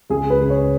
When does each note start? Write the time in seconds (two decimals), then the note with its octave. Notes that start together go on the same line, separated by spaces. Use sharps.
0.10 C#2 G#4
0.30 B4
0.40 C#2
0.50 C#5